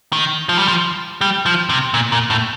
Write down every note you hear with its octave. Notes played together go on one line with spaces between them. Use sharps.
D#3
F3
G3
F3
G3
F3
C3
A#2
A#2
A2